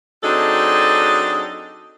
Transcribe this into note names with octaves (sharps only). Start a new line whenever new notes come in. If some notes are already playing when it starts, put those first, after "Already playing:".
F#3 C4 D4 D#4 G#4 A4